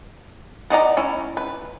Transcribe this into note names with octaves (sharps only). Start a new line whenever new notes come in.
B3 D#4 D5 A#5
C#4 E4
B4